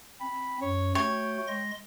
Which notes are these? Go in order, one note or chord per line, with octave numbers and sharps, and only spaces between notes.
C4 B5
F#2 C#5
A3 F#4 C#5 G5
G#3 C6 A#6